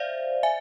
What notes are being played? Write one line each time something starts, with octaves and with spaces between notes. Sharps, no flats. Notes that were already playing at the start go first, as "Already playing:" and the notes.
Already playing: C5 D5 E5 F5
E5 G#5